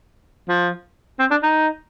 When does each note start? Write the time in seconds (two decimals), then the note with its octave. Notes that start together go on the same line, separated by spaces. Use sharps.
0.49 F3
1.19 C4
1.31 D4
1.43 D#4